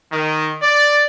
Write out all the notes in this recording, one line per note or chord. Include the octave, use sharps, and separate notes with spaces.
D#3
D5